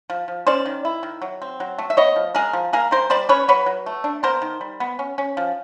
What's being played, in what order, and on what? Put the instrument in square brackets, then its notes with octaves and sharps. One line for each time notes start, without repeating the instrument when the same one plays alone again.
[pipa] F3
F3
C#4 C5 D5
D#3
E4
D#3
F#3
C4
F#3
A3
E5
B3 C#5 D#5
F3
G#3 G#4 A#4
F3
A#3 G#4 A#4
G3 A#4 C5
G3 C5 D5
C#4 B4 C#5
F#3 B4 C#5
F#3
A3
D4
B3 A#4 C5
D#3
G3
B3
C#4
C#4
F3